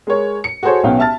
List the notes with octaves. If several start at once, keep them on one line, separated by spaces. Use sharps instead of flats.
G#3 A#4 C#5
C#7
F#4 G#4 A4 C5 C#5
B1 B3 C#4 F5 G5
E5 A5 F6 A6